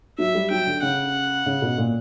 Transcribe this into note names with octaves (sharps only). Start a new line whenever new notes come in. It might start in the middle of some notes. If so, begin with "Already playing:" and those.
F#3 E5
G3
F#3 G5
D3
C#3 F#5
C#3
B2
A#2